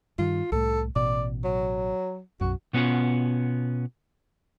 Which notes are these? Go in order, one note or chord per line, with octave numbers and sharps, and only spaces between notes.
G2 D#3 F4
C2 A2 A3 A4
A1 B2 D5
F#3
B1 F#2 F#4
B2 B3 C#4 F4 F#5